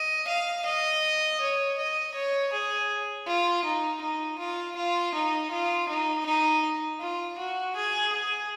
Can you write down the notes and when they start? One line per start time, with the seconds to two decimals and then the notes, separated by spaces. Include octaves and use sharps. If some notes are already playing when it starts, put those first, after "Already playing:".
Already playing: D#5
0.28 F5
0.65 D#5
1.41 C#5
1.78 D#5
2.14 C#5
2.53 G#4
3.27 F4
3.64 D#4
4.01 D#4
4.38 F4
4.76 F4
5.14 D#4
5.51 F4
5.89 D#4
6.26 D#4
7.00 F4
7.38 F#4
7.76 G#4
8.13 G#4